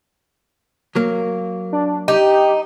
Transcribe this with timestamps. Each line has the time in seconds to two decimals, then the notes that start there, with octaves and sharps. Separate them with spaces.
0.95 F#3 A#3
1.72 D4
2.08 D#4 G4